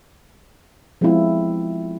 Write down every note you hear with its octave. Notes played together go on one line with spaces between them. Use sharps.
F3 G#3 B3 C4 E4 F4